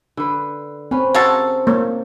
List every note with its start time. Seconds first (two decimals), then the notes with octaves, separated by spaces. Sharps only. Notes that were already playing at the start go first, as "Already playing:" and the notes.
0.17 D3 B4
0.91 C4 C#4 B4
1.14 G#3 F#4 A4 A#4
1.67 A#3 C#5